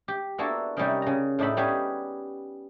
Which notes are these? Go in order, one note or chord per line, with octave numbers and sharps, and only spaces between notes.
G4
A#3 B3 D4 E4 F#4 A4
C3 G3 A#3 C#4 D#4 A#4
C#3 A#5
A2 D4 D#4 E5 G5 B5
G3 B3 C#4 G4 G#4 B4